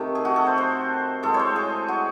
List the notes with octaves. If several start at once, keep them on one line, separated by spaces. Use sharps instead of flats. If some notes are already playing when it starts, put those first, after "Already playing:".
Already playing: C3 D#3 A3
G#4
F#4
A4
C5
C5
A2 G#3 A4
C#5
C5
G#4
F#4